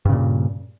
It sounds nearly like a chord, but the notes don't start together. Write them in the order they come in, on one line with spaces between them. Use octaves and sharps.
G2 C#3 A#2